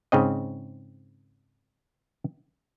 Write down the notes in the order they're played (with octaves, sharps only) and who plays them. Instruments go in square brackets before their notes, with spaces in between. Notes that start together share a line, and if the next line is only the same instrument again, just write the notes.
[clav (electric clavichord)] G#2 C#3 C4 D#5